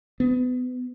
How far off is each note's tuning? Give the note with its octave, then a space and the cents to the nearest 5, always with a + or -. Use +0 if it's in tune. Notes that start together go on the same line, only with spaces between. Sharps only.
B3 +30